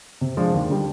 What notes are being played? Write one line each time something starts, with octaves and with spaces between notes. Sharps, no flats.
C3
F3 G#3 D4
D#2
D3 G3 D4